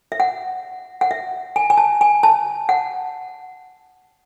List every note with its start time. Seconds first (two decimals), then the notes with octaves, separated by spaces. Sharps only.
0.12 E5
0.20 F#5
1.01 F#5
1.11 E5
1.56 G#5
1.70 G#5
1.77 A5
2.01 G#5
2.23 A5
2.69 F#5